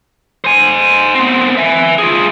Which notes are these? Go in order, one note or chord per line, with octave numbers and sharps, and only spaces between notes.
C5 G#5
B3 C4
E5 G#5
F4 G#4